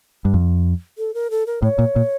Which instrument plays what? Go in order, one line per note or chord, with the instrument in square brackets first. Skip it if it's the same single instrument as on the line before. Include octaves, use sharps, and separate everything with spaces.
[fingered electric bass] G2
F2
[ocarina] A4
A#4
A4
A#4
[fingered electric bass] A2 [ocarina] C#5
[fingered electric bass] A#2
A#2